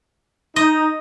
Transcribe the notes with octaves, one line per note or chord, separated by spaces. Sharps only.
D#4 D#5